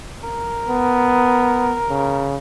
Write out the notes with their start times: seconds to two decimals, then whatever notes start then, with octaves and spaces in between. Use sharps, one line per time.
0.24 A#4
0.68 B3
1.89 C#3